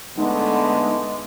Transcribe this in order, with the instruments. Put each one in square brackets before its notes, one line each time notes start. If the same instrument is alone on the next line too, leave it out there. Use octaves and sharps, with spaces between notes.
[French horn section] D3 A3 B3 [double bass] G#3 [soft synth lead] D#4